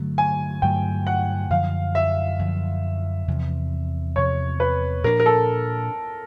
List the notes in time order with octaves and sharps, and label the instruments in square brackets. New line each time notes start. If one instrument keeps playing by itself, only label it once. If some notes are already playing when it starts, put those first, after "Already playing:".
Already playing: [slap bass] G2 D3 F#3 A3
[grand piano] G#5
[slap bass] G2 D3 F#3 A3 [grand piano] G5
[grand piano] F#5
[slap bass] F#2 D3 F3 [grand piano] F5
[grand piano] E5
[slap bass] F#2 D3 F3
E2 C3 F3
[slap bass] E2 C3 F3 [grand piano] C#5
[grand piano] B4
[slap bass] A#2 F3 A3 D4 [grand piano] A#4
[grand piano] A#4
A4